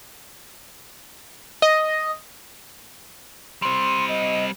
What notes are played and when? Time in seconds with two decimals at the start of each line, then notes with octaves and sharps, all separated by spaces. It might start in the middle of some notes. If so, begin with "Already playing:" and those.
1.62 D#5
3.62 G3 C4 C6
4.08 D#5